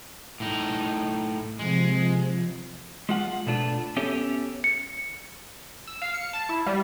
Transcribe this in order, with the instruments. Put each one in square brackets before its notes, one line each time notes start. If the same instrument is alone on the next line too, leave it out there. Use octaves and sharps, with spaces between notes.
[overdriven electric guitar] A2 D#4
[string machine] C3 F3 [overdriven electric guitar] G#3
[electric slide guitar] G#3 F4 F#5
B2 A3 D4 F4
B3 C#4 G4 A4 C#5 E5
[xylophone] C#7
[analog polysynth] E6
F5
C#7
A5
E4
G3